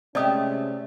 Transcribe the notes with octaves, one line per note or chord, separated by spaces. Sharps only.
C3 G#3 A3 C#4 G4 D5 D#5 D#6